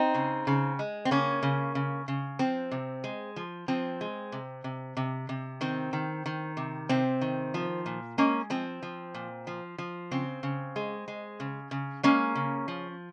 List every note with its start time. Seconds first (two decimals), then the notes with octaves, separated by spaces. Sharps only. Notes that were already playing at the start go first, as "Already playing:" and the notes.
Already playing: C4 D#4
0.14 C#3
0.47 C#3
0.79 G#3
1.05 C4
1.11 C#3 A#3 C#4
1.43 C#3
1.75 C#3
2.08 C#3
2.39 F3 C4
2.72 C3
3.04 G#3
3.36 F3
3.68 F3 C4
4.01 G#3
4.32 C3
4.64 C3
4.97 C3
5.29 C3
5.61 D#3 C4
5.93 D#3
6.26 D#3
6.57 C3
6.89 C3 C4
7.21 D#3
7.54 F3
7.86 A#2
8.18 G#3 A#3 C#4
8.50 F3 C4
8.83 F3
9.14 A#2
9.47 F3
9.78 F3
10.11 C#3 C4
10.43 C#3
10.76 G#3
11.08 G#3
11.40 C#3
11.71 C#3
12.03 G#3 A#3 C#4
12.35 C#3
12.68 F3